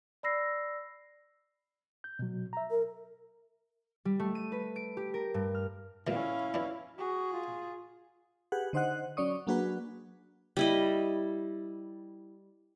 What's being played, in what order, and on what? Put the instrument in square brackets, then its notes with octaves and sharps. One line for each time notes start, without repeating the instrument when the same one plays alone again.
[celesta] D5 B5 E6 A#6 C7
[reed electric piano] G6
B2 F#3
E5 A#5
[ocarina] A#4
[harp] G3
A3
D#7
B4
D7
G4
A#4
G2
F6
[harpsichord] A#2 D3 E3 [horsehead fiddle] C#4 F5 [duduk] E4
[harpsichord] E3 D4
[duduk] F#4 [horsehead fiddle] G#4
[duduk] F4
[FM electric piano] G4 G#4 B4 F#5
D3 D#4 C5 D#5 F#5 F#6
F#3 C#4 D5 C#6 D#6
F#3 A#3 D4 F#4 G#4 B4
[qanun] G3 E4 D#5